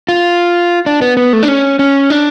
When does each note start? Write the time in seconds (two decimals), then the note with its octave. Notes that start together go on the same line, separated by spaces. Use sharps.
0.09 F4
0.86 D4
1.02 B3
1.17 B3
1.33 A3
1.43 D4
1.48 C#4
1.79 C#4
2.10 D4